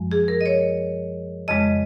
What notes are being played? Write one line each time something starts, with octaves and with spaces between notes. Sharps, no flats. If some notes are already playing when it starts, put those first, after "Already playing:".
Already playing: F#2 F3 G#3
G#4
A#4
D#5
C#5
F2 C#3 G#3 D#5